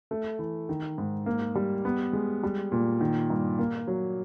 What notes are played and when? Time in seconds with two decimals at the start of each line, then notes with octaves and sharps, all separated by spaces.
0.11 A3
0.39 E3
0.69 D#3
0.98 G#2
1.26 A#3
1.55 G3
1.85 B3
2.13 G#3
2.43 G3
2.72 A#2
3.01 D#3
3.30 G2
3.59 A#3
3.88 F#3